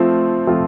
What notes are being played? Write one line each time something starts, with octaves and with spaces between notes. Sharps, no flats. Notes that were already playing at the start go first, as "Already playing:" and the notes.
Already playing: F3 A3 C4 F4
F3 A3 C4 F4